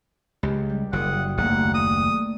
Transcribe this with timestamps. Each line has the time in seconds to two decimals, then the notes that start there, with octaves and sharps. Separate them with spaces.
0.43 C#2 G4
0.69 G3
0.93 F#1 F#5 G5 D#6
1.38 F#1 D#2 A3 A#3 D4 F#5
1.75 D#6